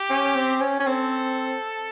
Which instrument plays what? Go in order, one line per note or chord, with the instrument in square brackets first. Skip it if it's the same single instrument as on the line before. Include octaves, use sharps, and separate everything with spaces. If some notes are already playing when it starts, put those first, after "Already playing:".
Already playing: [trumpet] G4
[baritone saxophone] C#4
C4
C#4
C#4
[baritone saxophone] C4 [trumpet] A4